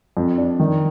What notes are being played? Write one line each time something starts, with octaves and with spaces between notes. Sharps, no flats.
F2
D4
D#3